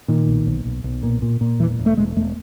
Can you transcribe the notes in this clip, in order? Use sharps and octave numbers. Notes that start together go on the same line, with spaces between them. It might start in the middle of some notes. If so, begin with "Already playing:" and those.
A#2 D#3
B1
B1
B1
B1
A#2
A#2
A#2
E1 E3
E1
A3
E1 G#3
E1 A3